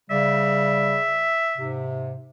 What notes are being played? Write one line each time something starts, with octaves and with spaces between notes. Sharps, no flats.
C#3 G3 D5 E5
G#2 C3